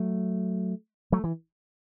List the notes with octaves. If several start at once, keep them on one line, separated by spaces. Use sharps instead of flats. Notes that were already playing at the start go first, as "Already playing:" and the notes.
Already playing: F#3 A3
F#3 A3
E3